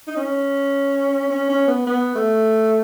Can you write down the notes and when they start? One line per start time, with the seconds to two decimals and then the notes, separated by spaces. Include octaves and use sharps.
0.07 D#4
0.16 C#4
1.30 C#4
1.49 C#4
1.68 B3
1.86 B3
2.15 A3